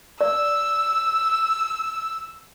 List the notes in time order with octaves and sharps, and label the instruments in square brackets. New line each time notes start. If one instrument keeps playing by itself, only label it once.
[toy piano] D5 [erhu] E6